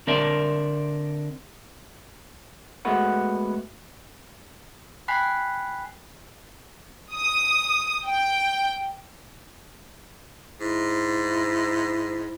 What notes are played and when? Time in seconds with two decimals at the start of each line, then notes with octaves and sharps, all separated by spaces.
0.07 D3 C4 A#4 D5 E5 A5
2.85 G#3 A3 B3 F#4 B4 F#5
5.08 G5 G#5 B5 F#6 B6 C7
7.15 D#6
8.07 G5
10.60 G#2 E4